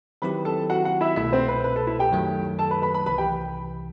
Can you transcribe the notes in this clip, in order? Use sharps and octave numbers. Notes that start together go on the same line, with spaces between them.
D#3 F#3 C4 E4 G4 B4 B5
A4 A5
F#4 F#5
F#4 F#5
E4 E5
C2 B2 A3 E4 E5
C4 C5
B4
B4
A4
E4 E5
G4 G5
F#2 D#3 F#3 A3
A4 A5
B4 B5
B4 B5
B4 B5
C2 C3 E3 B4 B5
G4 G5